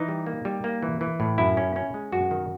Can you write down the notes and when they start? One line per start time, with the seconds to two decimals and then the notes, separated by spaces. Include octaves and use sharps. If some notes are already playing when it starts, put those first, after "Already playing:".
Already playing: E3 D#4
0.08 G3
0.26 A#3
0.45 G3
0.64 A#3
0.83 E3
1.01 E3
1.20 A2
1.38 F#2 E4
1.57 C#4
1.76 C#4
1.94 G#3
2.12 F#2 F#4
2.31 D#3